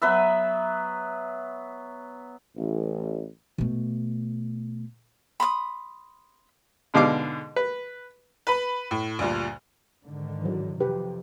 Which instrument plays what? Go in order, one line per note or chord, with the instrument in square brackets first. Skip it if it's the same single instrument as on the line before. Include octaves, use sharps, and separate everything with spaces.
[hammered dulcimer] F#3 B3 B4 E5
[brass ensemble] A1
[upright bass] B2 A3
[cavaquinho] B5 C6 D6 D#6
[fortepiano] G#2 B2 D3 F5 D6
B4
[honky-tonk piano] B4 B5
A2
D2 G2 A#2
[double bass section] G#2 D3 D#3
[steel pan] E3 F#3
[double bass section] F2 C3 [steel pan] G4 B4